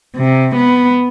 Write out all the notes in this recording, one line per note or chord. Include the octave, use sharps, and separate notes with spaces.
C3
B3